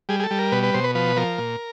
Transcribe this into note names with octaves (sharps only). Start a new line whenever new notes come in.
G3 G#4
G#4
A4
G3
A#4
B2 B4
B4
B2 C5
B4
F3 B4
F3 A#4
A#2